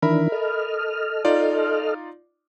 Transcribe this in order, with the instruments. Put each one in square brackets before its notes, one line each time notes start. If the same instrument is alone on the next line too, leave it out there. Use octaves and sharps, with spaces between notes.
[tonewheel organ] D#3 E3 D4 [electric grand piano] A#4 E5 B5
[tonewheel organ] A4 D#5 F6
[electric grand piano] D#4 F4 D5